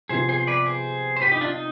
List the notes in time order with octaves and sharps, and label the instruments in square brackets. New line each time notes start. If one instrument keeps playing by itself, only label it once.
[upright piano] C3 F3 B3 [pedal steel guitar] G#4 C5
[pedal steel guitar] G#4 C5
B4 D5
G#4 C5
C5
G4 B4
D#4 G4
D4 F4
D#4